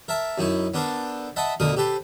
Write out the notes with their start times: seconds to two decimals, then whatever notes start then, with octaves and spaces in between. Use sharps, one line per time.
0.08 A#4 E5 A5
0.38 F#2 D#4 E4 C#6
0.74 B3 D4 A4 A#4 C5
1.36 D#5 E5 F#5 A5 B5
1.60 D2 B2 D3 F3 A#4 D#6
1.77 G4 A4 B4 C5